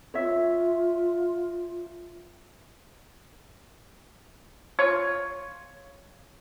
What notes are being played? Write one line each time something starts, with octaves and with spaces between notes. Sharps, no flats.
F4 C#5 E5
F4 C#5